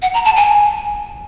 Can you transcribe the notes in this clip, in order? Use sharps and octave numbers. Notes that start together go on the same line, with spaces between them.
F#5
A#5
A5
G#5